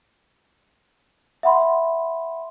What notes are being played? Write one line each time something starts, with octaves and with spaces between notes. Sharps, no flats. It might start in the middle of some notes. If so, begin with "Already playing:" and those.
E5 F#5 B5 C6